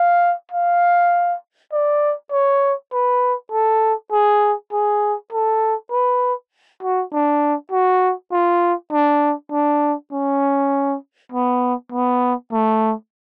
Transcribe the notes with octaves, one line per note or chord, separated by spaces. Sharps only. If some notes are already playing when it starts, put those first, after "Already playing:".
Already playing: F5
F5
D5
C#5
B4
A4
G#4
G#4
A4
B4
F#4
D4
F#4
F4
D4
D4
C#4
B3
B3
A3